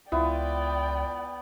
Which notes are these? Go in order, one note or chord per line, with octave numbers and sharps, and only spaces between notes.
C#2 B3 E4 F4 D5 G5